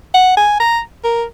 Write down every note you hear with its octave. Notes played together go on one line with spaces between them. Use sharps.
F#5
G#5
A#5
A#4